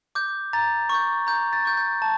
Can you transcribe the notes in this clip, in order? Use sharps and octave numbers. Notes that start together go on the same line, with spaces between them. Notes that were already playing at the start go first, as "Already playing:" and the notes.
D6 G6
A#5 A6
C#6 G6
A#5 G6
A6
C#6 G6
G6
A5